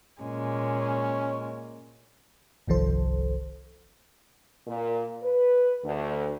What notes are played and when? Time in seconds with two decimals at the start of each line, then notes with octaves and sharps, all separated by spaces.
0.21 A#2 G#3 C#4
2.67 G1 C2 D#3 F3 A4 C5
4.67 A#2
5.23 B4
5.83 D2